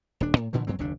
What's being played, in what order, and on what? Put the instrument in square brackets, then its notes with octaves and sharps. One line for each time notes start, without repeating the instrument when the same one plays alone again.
[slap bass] D#1 D4
A2
A#2 D3 E3 F3
G2 F#3 C4
F#1 D#2 C3 D4